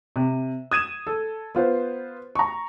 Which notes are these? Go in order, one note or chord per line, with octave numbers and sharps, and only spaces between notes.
C3
D#6 G#6 D#7 E7
A4
B3 F4 C5
A#5 C#6